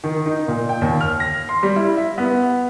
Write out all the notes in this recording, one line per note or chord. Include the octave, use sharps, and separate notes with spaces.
D#3
D#4
A#2
G5
D#2
F6
A#6
C6
G3
E4
E5
B3